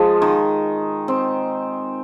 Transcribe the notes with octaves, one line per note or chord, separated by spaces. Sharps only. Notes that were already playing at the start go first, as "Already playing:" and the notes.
Already playing: F3 G#3
D#3
C4